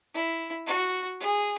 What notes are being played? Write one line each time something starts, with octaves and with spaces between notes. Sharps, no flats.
E4
F#4
G#4